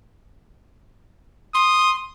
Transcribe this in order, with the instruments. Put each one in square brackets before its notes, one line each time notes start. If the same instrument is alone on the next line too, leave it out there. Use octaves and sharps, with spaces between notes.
[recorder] C6 [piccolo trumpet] D#6